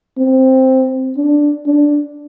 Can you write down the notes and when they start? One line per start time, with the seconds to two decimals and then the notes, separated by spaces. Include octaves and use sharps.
0.18 C4
1.17 D4
1.66 D4